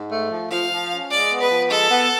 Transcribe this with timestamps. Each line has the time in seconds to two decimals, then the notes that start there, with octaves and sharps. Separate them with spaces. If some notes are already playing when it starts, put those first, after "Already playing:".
Already playing: G#2
0.11 A3
0.31 F3
0.51 F3 F5
0.71 F3
0.91 C#4
1.11 G#3 D5
1.31 B3
1.41 B4
1.51 F3
1.70 G#3 A4
1.91 B3